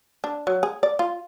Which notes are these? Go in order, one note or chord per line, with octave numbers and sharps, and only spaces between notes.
D4
F#3
G#4
D5
F4